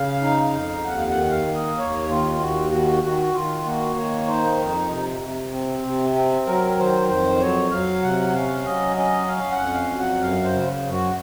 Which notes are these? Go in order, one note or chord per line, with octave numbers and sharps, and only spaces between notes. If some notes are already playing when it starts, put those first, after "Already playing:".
Already playing: C#3 F5
D#4
F2
D#2 F#5
F5
F#5
D#3
F5
A#3
D#5
D#2 C#5
D#3 F4
D#2 F#4
D#3 F#4
D#3 F#4
D#3 F4
A#3 F#4
D#3 C#5
D#4 C5
F2
C3
C3
C4
C3
C4
F#3 A#4
D#3 C5
F2 C5
F#3 C#5
F#3 F5
C3 F#5
C#4 F5
F#3 D#5
C#4 D#5
C#4 F5
F#5
F2
F5
F#3
F#5
F#2 F5
C5
C#3
F#2
F#4